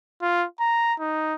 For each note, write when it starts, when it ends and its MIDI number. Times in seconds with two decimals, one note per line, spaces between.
0.22 0.45 65
0.60 0.94 82
1.00 1.35 63